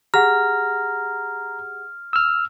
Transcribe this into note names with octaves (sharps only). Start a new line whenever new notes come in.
G4 G#4 F#5 A#5 F6
E6 F6